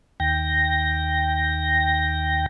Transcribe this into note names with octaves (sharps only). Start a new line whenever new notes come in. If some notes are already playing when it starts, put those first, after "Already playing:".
D#2 G5 A#6